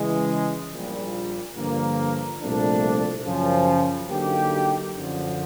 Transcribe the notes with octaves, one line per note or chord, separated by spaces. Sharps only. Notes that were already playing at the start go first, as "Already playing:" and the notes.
Already playing: C#3 E3 G#3
A#1 A#2 G3
G2 D3 F3 A#3
C2 A#2 F3 A3 D4
F#2 C#3 F3
D3 F#3 A#3 D#4 G4
F#2 D3 F3